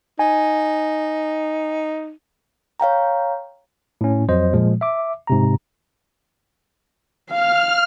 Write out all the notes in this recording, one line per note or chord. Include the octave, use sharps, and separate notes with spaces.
D#4 G#5
C#5 F5 G5 A#5
A2 C#4
F2 F#3 C5 D#5
A#2 F3 G#3
E5 D6
G#2 C3 A#5
F5 F6